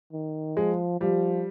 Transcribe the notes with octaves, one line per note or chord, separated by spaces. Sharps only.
D#3
F3 G#3
F3 G3